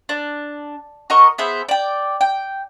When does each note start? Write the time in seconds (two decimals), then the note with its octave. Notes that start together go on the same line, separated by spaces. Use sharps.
0.09 D4
1.10 F#4 A#4 D#5 C#6
1.38 B3 G#4 C5 E5
1.69 D5 G5
2.21 G5